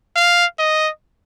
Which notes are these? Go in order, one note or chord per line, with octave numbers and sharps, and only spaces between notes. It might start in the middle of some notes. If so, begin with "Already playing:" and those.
F5
D#5